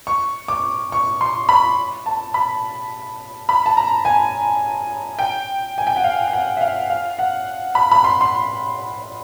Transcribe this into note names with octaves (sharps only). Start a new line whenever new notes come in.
C#6
D6
C#6
C6
B5
A5
B5
B5
A5
A#5
G#5
G5
G#5
G5
F#5
F5
G5
F#5
E5
F5
F5
F#5
B5
B5
C6
C6